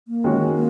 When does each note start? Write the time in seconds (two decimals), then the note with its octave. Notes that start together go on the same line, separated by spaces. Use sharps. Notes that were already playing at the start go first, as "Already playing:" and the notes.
0.08 A#3
0.24 D#3 G#3 C#4 F#4
0.54 A#3